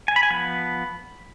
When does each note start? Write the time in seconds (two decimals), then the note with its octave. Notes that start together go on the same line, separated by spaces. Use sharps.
0.08 G#5
0.16 B5
0.23 G#5
0.30 F3 B3 B5